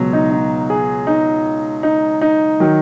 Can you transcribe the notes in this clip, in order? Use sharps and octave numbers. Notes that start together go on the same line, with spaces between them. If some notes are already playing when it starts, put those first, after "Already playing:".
Already playing: C#2 B2 F#3
D#4
D#4
G#4
D#4
D#4
D#4
D#3 F#3